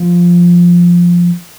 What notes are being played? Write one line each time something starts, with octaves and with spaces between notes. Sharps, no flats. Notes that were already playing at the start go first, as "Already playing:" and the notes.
Already playing: F3